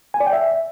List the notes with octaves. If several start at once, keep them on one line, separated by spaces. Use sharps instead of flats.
G#5
D5
G5
E5